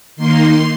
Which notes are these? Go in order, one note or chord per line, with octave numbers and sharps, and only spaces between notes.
D#3 A#3 D#4 C6